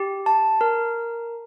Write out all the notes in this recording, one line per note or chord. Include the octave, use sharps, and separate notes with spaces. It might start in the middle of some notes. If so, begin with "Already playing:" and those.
Already playing: G4
A5
A#4